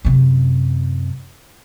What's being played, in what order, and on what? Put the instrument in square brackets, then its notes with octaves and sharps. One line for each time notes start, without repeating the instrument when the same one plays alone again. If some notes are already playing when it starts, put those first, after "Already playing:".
[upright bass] F#2 C3